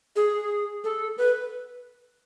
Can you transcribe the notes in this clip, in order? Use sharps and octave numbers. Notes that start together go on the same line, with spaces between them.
G#4
A4
B4